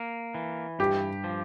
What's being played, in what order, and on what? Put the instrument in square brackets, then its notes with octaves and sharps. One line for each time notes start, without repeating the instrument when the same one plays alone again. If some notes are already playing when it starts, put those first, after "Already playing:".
Already playing: [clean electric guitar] A#3
E3
[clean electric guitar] G2 [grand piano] G4
[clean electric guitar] F3